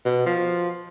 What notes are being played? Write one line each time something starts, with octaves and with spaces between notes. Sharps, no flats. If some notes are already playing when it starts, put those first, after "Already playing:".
B2
F3